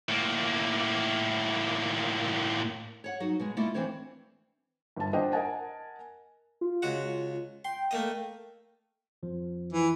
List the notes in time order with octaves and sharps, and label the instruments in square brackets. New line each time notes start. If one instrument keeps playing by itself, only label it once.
[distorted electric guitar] A2 A#3
[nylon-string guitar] C#5 F#5
F#3 D#4 F#4
B2 G#3
A3 A#3 E4 F4 D5 D#5
E3 C4 D4 C5 C#5
[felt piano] G1 A5
D4 C5 D#5 F#5 G5
A#4 D#5 F#5 G#5 A5
[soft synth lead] F4
[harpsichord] C#2 F#4 F#5
[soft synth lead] G5 [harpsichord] C6
[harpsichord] A3 A#3 D#5
[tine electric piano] F2 F3
[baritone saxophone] E3